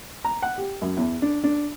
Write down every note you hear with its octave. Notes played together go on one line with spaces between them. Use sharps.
A#5
F#5
G4
F#2
E2
D4
D4